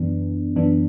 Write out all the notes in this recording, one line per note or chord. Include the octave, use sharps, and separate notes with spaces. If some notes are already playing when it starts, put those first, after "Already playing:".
Already playing: F#2 E3 B3 D4
F#2 E3 B3 D4